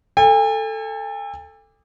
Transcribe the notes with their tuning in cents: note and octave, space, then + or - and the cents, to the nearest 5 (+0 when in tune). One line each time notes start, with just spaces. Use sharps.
A4 +5 G#5 -45